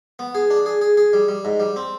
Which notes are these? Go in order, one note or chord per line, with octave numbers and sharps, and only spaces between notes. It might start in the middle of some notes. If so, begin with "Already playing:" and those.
B3
G#4
D4
G#4
G#4
G#4
G3
G3
G#2
G3
C4